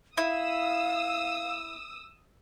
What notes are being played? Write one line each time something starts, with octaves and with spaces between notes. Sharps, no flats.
E4 F5 D#6 E6